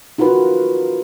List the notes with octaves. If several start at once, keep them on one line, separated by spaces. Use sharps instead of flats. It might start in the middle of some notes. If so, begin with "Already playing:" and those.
D#4 F4 F#4 A#4 B4